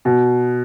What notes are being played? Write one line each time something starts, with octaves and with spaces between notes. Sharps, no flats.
B2